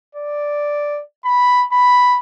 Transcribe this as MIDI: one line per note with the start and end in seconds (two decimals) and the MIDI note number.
0.15 1.01 74
1.25 1.64 83
1.72 2.19 83